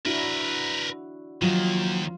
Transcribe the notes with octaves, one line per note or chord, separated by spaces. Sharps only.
D4 E4 F#4 A#4 B4
D#2 D#3 F3 F#3 F4